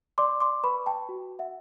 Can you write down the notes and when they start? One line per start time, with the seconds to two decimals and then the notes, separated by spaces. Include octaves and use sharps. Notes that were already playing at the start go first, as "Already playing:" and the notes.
0.18 D5 C6 D6
0.40 C6 D6
0.64 B4 B5 C#6
0.86 G5 A5
1.09 F#4
1.39 E5 F#5